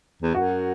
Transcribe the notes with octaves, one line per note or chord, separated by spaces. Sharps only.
E2
F#2 F#4